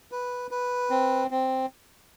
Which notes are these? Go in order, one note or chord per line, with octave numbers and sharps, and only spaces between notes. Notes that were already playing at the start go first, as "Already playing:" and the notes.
B4
B4
C4
C4